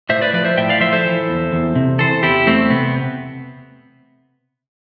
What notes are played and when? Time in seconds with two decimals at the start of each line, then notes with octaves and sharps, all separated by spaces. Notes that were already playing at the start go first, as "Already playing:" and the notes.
0.09 A2 C5 E5
0.21 B4 D5
0.33 F3 B4 D5
0.45 C5 E5
0.57 A2 E5 G5
0.69 D5 F5
0.80 F3 C5 E5
0.93 A4 C5
1.05 E3
1.29 E2
1.52 E2
1.75 C3
1.99 E3 A4 C5
2.23 E2 E4 G4
2.46 E2 A3 C4
2.70 C3 B3